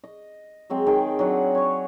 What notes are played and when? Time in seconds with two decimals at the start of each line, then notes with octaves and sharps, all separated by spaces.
0.04 D#5
0.70 F#3 G#3 C4
0.87 D#3 G#4 G5
1.19 F#3 D4 F#5
1.55 C#5 C#6